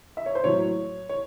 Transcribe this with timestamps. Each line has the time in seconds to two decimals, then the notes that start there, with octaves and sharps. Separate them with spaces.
0.17 E5
0.26 C#5
0.35 C5
0.44 A2 F#3 C#5
1.09 C#5